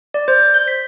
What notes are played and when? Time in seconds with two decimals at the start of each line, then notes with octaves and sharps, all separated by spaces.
0.14 D5
0.28 C5
0.54 G6
0.68 B6